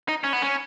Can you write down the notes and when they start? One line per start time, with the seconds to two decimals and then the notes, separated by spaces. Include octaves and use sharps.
0.09 D#4
0.24 C#4
0.33 B3
0.42 C#4